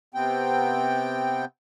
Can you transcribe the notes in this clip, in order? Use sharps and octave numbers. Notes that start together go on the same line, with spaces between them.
C3 B3 C4 G5